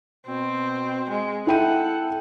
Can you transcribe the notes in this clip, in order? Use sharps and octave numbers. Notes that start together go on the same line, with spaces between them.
B2 C4
G#3
E4 A4 F#5 G5 D#7